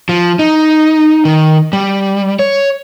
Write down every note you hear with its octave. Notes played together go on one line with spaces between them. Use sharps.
F3
D#4
D#3
G3
C#5